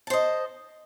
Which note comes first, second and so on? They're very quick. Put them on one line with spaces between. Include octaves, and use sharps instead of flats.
A5 C5 D#5